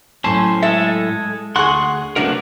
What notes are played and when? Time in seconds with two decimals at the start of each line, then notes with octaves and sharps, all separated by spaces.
0.24 A2 F#3 C#4 C5 A5
0.62 G#3 A4 E5
1.56 D2 G#4 F#5 C6 C#6 F#6
2.16 C3 F#3 A3 D4 A#4 B4 F5 F#5